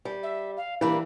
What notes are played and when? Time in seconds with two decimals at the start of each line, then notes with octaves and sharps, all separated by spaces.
0.05 G3
0.23 E5
0.57 F5
0.81 E3 G3 A#3 D4 B5